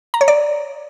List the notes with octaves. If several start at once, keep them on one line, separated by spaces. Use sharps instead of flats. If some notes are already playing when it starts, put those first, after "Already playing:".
A#5
C#5
D5